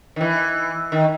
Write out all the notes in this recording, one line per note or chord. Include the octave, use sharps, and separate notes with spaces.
D#3
E3
D#3